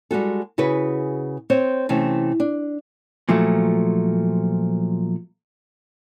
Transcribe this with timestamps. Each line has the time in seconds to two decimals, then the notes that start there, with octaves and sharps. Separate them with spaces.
0.11 G3 G#3 F#4 A4
0.58 C#3 E4 F#4 G#4 B4
1.50 C4 C5 C#5
1.89 C3 E3 A3 C#4
2.40 D4
3.29 A#2 F3 F#3 A3